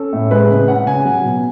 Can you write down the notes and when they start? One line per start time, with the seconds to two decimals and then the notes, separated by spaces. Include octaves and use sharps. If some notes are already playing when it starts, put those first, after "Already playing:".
Already playing: C#4 A4
0.13 A2
0.31 G#3 B4
0.50 C#3
0.68 C#4 F#5
0.86 C#3 G#5
1.05 F#3
1.24 B2